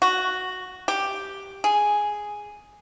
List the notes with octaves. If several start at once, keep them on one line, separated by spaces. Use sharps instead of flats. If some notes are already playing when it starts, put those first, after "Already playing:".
F#4
G4
G#4